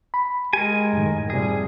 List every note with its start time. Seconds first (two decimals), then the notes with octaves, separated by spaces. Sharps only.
0.14 B5
0.53 G#3 G4 A#4 G#5
0.93 F#2 A2 D#3
1.30 C3 F3 G3 G#4